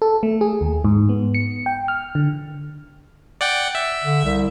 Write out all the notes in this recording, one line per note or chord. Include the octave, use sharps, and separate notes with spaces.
A4
A3
G#4
D#2
G#2
B3
C#7
G5
F6
D3
D5 F#5 G5
E5
D3
C2